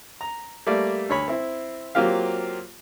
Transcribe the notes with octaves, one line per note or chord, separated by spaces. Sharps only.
A#5
G3 A3 A#3 D5
D2 C#5 B5
C4 E4
F#3 A#3 C4 F4 G4 F5